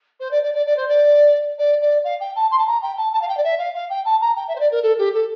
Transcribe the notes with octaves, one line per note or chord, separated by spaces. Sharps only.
C5
D5
D5
D5
D5
C5
D5
D5
D5
F5
G5
A5
C6
A5
A#5
G5
A5
A5
F5
G5
D5
E5
F5
F5
G5
A5
A#5
G5
E5
C5
D5
A#4
A4
G4
A4